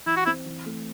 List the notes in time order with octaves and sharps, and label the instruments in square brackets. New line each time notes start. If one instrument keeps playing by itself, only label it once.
[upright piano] E3 [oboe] E4
[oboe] F#4
[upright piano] C4 [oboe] E4
[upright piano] E3
A3